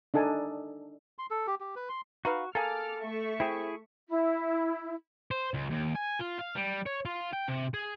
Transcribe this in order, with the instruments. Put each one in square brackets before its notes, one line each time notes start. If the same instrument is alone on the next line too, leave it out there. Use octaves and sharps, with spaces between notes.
[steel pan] D4 D#4 A4 G#5 A5
[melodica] C6
A4
G4
G4
B4
C6
[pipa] D#4 B4 F5 [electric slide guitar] F#4
[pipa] A#3 G#4 [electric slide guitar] A4 [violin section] D6 F6
[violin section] A3 E5 C#6
[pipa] C4 [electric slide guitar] E4 G#4
[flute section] E4
[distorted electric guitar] C5
C#2
D#2
G#5
F4
F5
G3
C#5
F4
G5
C3
G#4